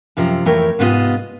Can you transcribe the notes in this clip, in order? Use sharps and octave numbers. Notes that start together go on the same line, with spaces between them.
F#2 C3 F3 A#5
F2 E3 A3 A#4 C#5 G5
G#2 C3 B3 E4 F4 D#5